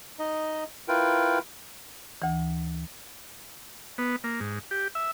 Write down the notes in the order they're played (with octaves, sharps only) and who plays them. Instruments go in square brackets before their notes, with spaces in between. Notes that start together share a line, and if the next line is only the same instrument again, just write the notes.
[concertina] D#4 D#5
E4 F4 A#4 B4 G5
[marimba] D2 E3
[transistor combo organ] B3
A#3
G#2
G4
E5